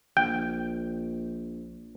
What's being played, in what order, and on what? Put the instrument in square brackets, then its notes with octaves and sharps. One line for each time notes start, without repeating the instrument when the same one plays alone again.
[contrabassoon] A#1 [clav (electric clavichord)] G5